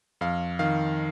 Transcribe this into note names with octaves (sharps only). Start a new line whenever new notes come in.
F2 F5
D#3 F5